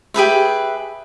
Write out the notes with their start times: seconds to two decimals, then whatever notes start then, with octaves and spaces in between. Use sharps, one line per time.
0.14 G4 G#4 B4 E5